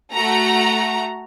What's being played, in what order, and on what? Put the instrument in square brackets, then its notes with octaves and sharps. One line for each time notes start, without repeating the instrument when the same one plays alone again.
[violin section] A3 F#4 A#5